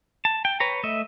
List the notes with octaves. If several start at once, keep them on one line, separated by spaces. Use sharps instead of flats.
A5
G5
B4 C#5 A#5
A3 D#5 E5